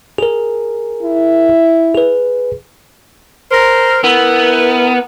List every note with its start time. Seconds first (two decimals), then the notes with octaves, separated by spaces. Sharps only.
0.18 G#4 A#4
1.03 E4
1.94 G#4 B4
3.52 A#4 C5
4.04 B3 E4 A#4